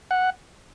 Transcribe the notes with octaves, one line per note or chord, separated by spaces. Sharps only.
F#5